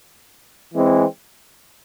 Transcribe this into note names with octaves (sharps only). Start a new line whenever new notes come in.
E3 G#3 C4